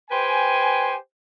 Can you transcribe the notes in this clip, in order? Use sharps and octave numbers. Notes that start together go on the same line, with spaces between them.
G4 B4 C5 G5 G#5